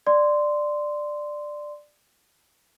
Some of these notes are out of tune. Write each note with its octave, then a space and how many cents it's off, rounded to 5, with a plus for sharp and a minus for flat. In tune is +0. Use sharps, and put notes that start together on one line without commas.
D5 +10 C6 -10